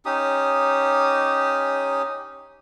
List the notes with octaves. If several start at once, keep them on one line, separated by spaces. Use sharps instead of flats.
C#4 D#4 G4 D#6